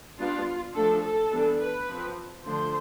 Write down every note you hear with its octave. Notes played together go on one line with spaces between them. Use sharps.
G3 B3 D4 F4
F3 A3 D4 A4
A4
E3 G3 B3 D4
B4
F3 C4
D3 F3 A3 D4 C5